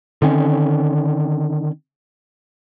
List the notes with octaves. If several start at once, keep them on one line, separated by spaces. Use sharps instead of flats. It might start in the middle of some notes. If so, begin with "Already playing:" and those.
D3 D#3 C4 C#4